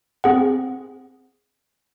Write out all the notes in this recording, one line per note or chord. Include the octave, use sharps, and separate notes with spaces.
C4 G#4 F#5